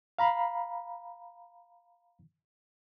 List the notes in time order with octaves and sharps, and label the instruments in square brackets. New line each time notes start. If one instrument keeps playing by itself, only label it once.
[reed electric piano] F5 A#5 B5